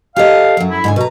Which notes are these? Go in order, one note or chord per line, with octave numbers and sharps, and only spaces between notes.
G4 A4 D#5 F5
F#2 F#3
E4
G#2 D3 G#5
B2 B4 A#5